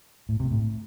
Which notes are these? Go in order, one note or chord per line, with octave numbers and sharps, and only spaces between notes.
A2
C3
A2